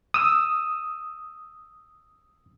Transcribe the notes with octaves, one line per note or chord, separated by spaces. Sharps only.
D#6 E6